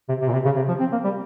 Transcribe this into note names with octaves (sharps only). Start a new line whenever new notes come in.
C3
C3
A#2
C3
C#3
C3
F3
C4
A#3
G3